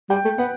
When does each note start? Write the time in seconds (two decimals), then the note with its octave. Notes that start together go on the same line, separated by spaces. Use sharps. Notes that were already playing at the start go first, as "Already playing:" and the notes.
0.10 G3 G5
0.25 A3
0.38 B3 F#5